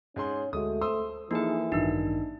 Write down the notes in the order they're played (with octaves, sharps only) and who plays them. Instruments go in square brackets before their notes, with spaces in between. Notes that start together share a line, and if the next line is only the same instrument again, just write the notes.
[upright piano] G#2 G#4 C6 [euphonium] C#4
[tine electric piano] D2 G#3 F#4 [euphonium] A3 [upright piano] D#6
[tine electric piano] C5 [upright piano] C6 D#6 E6
[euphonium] E3 [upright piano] F3 A4 [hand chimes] A#3 B4 [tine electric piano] D#4 G#4
[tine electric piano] A1 G2 D#3 [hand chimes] D4 D#4 [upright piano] F#4 E6